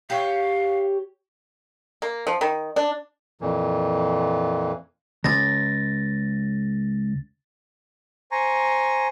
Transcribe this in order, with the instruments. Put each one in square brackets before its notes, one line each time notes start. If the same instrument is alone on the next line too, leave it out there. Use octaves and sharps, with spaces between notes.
[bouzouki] G4 C#5 [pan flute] F5
[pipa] A#3
F3
D#3
D4
[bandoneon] F2 A#2 E3
[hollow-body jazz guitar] C#2 [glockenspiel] A6 A#6
[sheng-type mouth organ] C5 G#5 A#5 C#6